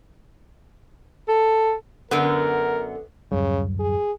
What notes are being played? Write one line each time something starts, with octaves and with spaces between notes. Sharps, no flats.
A4
F#2 D3 B3 A#4
D1 F#2 C#3 G3
G#4